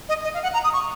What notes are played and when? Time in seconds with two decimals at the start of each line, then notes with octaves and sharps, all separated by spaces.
0.09 D#5
0.24 D#5
0.34 F5
0.43 F#5
0.54 A#5
0.64 D#6
0.73 C#6